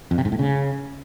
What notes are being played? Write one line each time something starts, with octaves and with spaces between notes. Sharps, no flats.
F2
C3
G#2
A2
C#3